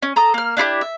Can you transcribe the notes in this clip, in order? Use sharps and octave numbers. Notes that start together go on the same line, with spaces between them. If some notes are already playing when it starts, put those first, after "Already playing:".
C#4
A4 A#5 D#6
A#3 F6
D4 E4 F4 G4
E5